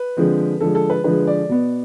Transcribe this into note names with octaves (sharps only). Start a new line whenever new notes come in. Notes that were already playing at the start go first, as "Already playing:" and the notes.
Already playing: B4
D3 F3 G#3 C4
D3 F3 G#3 A4
A4
B4
D3 F3 G#3 B4
D5
B2 B3